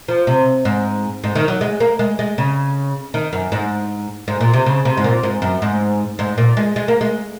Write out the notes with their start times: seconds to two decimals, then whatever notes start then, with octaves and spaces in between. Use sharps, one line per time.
0.08 F3
0.27 C3
0.65 G#2
1.24 G#2
1.35 D#3
1.48 F#3
1.61 G#3
1.80 A#3
1.99 G#3
2.19 G#3
2.38 C#3
3.14 D#3
3.33 F#2
3.52 G#2
4.28 G#2
4.41 A#2
4.53 C3
4.66 C#3
4.85 C3
4.97 G#2
5.04 A#2
5.23 G#2
5.42 F#2
5.62 G#2
6.19 G#2
6.38 A#2
6.57 G#3
6.76 G#3
6.88 A#3
7.01 G#3